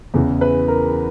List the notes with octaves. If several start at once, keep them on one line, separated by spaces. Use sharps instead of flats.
E2 C#3 E3
B4
A#4